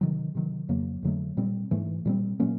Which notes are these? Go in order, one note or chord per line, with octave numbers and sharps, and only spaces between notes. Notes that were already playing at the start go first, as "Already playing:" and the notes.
C3 D#3 F#3
C3 D#3 F#3
F2 C#3 F#3 A#3
F2 D3 F#3 A3
A#2 G3 C4
G#2 E3 A3
A#2 G3 C4
A#2 F#3 A#3 C#4